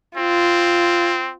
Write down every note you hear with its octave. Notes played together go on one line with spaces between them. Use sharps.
C4 F4